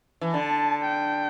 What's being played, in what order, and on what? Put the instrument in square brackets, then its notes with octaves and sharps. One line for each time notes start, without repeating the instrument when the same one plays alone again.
[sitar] E3
[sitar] D3 [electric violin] A5
[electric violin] G5